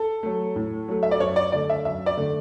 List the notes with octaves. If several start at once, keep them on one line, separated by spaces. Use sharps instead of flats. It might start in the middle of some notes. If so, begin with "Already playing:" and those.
Already playing: A4
F#3 A3
A2
F#3 A3
E5
D5
F#2 C#5
D5
D3 A3 D5
E5
F#2 E5
D5
D3 A3